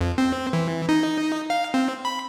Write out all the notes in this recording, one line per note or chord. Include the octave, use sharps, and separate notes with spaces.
F2
C4
E3
D#4
F5
C4
B5